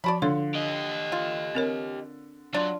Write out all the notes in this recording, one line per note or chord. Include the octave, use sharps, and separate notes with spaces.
F3 F#4 D5 A5 B5
D3 F4 C#5
G4 D#5
F4
C4 A#4 C#5
F#3 D4 F4 D5